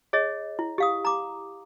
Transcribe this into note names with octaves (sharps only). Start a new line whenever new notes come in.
G#4 C#5 D#5
E4
G4 F5 D#6
A#5 D6